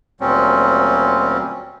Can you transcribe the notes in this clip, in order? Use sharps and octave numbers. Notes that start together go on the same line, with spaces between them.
D2 A#2 F#3 G3 C4 C#4